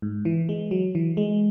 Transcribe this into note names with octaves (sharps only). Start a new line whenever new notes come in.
G#2
E3
G#3
F#3
E3
G#3